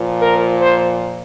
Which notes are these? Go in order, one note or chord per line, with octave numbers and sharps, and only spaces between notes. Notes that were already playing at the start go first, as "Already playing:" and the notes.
Already playing: A#2 F3
A#4
C5